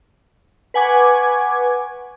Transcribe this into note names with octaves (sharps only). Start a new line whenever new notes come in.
B4 F#5 G#5 C#6 D6 G#6